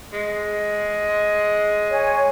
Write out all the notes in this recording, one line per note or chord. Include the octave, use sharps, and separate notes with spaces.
G#3
C#5 G#5